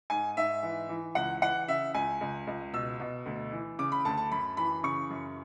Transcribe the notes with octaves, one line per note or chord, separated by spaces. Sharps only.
G#2 G#5
G#2 E5
E3
E3
C#2 F#5
E3 F#5
C#3 E5
C#2 G#5
C#2
C#2
B2 E6
B2
D2
E3
C#3 D6
B5
D2 A5
A5
F#2 B5
E3 B5
C#3 C#6
F#2